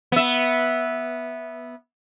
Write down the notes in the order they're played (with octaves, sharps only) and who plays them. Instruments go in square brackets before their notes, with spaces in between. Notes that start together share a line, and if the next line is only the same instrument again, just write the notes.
[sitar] B3 E5